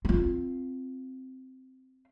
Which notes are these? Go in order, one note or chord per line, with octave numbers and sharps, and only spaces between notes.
C4 F4